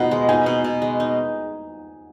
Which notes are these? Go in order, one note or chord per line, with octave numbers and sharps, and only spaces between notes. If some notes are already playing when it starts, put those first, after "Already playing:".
Already playing: B2 D#4 D#5 F#5
G#3
D#4 G#5
B2
B2
G#3
D#4